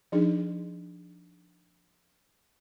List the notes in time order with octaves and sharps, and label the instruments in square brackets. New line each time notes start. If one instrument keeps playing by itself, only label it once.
[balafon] F3 D4 D#4 G#4